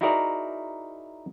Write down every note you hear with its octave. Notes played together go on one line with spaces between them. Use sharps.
D#4 E4 F#4 G#4 A#4 D5